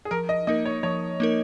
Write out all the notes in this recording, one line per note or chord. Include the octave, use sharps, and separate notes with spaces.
G#4
F3 A#4
D#5
A#3 D#4 A#4 D#5
C#5
F3 C#5
A#3 D#4 A#4